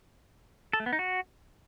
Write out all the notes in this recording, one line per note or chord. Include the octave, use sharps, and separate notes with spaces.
A4
A3
B3
D#4
F#4